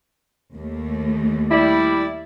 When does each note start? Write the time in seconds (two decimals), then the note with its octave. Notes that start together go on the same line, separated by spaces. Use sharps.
0.54 D#2 A3
1.49 G3 E4 D5